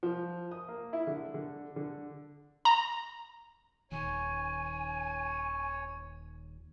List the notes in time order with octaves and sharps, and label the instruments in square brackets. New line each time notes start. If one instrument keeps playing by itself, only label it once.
[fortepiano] F3
D#6
A#3
E4
D3
D3
D3
[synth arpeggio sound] A#5
[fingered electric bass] D#1 D#2 [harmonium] C#5 [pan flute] G#5